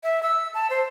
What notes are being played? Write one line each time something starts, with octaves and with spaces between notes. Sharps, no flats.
E5
E6
A5
C5